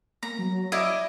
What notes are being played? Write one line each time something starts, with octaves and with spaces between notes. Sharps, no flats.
A#3 A#5
F#3
E4 D5 D#5